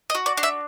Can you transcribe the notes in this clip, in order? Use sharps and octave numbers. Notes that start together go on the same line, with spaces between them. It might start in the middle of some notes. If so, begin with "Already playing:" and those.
D#5
F#4
D5
D4
E5